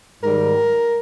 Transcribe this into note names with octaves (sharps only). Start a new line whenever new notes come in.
G#2 D#3 G3 A#4